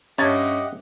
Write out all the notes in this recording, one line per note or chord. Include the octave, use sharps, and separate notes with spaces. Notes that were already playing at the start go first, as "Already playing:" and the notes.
G2 C#4 G4 C#5 D#5 E5 F#5 A5